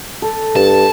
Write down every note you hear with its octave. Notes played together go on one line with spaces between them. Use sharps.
A4
G2 A5